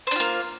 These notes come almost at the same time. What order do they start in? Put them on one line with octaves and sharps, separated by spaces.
C5 D4 F4 A#3